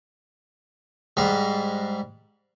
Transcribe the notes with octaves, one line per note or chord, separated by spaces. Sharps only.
G#2 G3